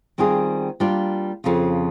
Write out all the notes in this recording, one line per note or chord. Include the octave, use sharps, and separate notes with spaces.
D#3 G3 C4 F4 G#4
G3 A#3 D4 F4
F2 C#3 F3